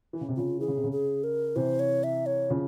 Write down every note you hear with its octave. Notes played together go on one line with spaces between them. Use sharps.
E3
C#3
C3
C#3 F4
E3 G#4
C#3
C3
C#3
G#4
A#4
C3 E3 C5
C#5
E5
C#5
C#3 F3